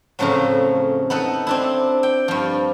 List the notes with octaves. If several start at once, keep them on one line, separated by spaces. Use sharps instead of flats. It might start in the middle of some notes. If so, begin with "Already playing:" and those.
F2 A2 C#3 F3 F#3
B3 D#4 A4 F#5
C4 D4 E4
G5
G2 F3